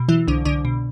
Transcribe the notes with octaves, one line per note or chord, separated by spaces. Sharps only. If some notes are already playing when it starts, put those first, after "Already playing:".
Already playing: B2
E3 F#3 E4
C2 D3 D4
C2 D3 D4
B2